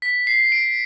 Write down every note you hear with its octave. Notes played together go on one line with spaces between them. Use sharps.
B6
C7
D7